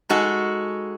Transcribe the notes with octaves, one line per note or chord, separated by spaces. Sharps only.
G#3 D#4 F#4 A4